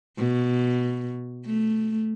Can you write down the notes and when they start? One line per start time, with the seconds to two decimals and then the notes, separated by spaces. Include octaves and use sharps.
0.17 B2
1.45 A3